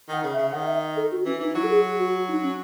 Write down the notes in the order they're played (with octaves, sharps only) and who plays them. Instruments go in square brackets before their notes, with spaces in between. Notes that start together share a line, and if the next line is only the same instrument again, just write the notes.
[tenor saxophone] D#3 [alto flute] F#5
[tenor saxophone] C#3
[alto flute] E5
[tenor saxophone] C#3
[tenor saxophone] D#3 [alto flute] F#5
[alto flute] E5
A4
F#4
[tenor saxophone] E3 [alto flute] C#4
[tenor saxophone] E3 [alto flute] D#4
[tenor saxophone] F#3 [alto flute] E4
[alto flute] A4
G#4
F#4
D#4
C#4